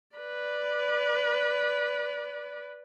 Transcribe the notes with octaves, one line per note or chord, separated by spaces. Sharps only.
B4 D5